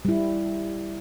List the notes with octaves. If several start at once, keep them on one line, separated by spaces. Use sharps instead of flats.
G3 E4